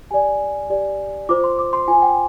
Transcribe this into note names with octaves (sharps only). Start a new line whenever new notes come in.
G4 D5 G#5
G4 D5
F4 C5 D6
C6
D6
C6
F4 C5 G#5
G5